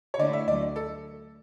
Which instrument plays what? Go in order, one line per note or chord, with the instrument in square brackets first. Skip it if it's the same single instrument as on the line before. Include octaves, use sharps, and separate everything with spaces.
[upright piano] C#5
[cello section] D3 A3 E4 [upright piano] D5
[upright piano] E5
[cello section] D2 D3 F#3 A3 [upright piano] D5
[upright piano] A4